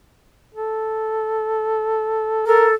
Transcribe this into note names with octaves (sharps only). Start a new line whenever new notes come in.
A4
A4 A#4